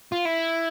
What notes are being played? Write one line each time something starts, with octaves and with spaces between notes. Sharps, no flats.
F4
E4